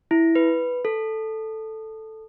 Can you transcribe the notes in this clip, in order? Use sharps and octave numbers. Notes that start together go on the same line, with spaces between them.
E4
B4
A4